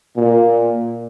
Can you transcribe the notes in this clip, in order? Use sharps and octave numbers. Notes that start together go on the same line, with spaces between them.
A#2